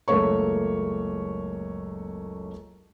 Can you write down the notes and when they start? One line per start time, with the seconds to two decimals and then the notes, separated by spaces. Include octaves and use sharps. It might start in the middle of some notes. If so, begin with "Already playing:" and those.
0.08 F#1 C#2 A3 A#3 C#5 C#6